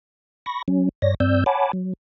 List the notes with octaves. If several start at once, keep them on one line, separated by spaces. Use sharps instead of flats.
B5 C#6 A#6
F#3 C#4
G2 C#5 D5 A#6
G2 C4 D5 E6 G6
C#5 F#5 G#5 A5 B5 D6
F#3